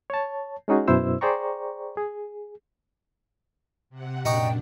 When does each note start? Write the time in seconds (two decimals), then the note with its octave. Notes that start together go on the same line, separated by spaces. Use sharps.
0.10 C#5 A5
0.68 G#3 C#4 D#4 F#4 G#4
0.88 F#2 B2 E4 C5 E6
1.21 G#4 C5 D5 G5 A#5 C#6
1.97 G#4
3.90 C3 F#5
4.25 F#2 A#2 D4 D#4 G5 C#6 D#6